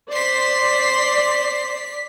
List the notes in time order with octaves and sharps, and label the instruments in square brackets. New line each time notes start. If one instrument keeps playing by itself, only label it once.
[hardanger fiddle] C5 C6 [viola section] D5 [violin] B6 C7